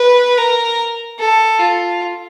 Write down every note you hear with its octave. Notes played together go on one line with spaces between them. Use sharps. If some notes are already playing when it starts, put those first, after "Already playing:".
Already playing: B4
A#4
A4
F4